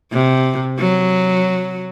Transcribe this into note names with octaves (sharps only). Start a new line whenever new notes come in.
C3
F#3